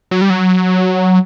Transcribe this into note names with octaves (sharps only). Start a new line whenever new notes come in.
F#3
G3
F#3